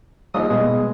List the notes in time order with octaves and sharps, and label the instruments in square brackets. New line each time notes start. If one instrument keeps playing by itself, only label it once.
[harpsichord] A#1 D#2 D#6 [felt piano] G3
[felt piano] B2 [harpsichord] G#3